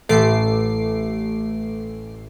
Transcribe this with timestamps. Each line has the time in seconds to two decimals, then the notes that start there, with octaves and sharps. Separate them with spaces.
0.09 A1 A3 D6 C7